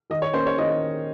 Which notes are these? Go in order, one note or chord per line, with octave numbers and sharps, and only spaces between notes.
D#3 D#5
C#5
A#3 C#4 C5
C#5
D#3 D#5